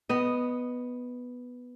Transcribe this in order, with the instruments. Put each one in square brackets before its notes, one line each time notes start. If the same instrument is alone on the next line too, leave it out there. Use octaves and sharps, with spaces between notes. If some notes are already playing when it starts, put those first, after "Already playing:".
[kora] B3 D#5